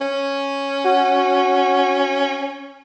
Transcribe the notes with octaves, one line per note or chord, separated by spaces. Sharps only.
C#4
F#4